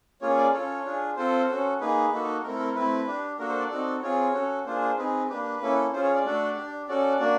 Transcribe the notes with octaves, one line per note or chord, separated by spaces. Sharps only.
A#3 C#4 F4 G#4 C#5
D5
C#4 F4 A4 C#5
D4 F4 G#4
C4 F4 A4 C5
C#4 F#4 A4
A#3 D#4 G#4 B4
A#3 D#4 F#4 A4
A3 C4 E4 A4 A#4
A#4
A3 C4 E4 B4
D4 G4
A#3 D4 F#4 A4 A#4
C5
D5
C4 D#4 F#4 A4
C4 F4 G#4 C#5
C#4 F#4 A4
A#3 D4 F4 G#4 C5
C5
C4 D#4 G#4 B4
A#3 D4 G4 B4
A#3 C#4 E4 A4
C#4 F4 G#4 C5
C#5
D5
A3 D4 F#4 A4
D4 G4
C#4 F#4 A4 D5
A#3 D4 F#4